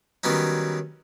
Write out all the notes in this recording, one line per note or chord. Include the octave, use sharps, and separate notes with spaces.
D#3 F#3 G3 B3 C#4 D#4